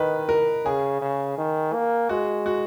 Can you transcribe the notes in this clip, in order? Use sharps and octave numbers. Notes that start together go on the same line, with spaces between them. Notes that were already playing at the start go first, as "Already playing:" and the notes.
Already playing: D#3 B4 D#5
A#4
C#3 G#4
C#3
D#3
A#3
G#3 F#4
F#4